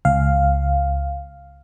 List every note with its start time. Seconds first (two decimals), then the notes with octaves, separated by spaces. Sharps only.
0.05 C#2 F5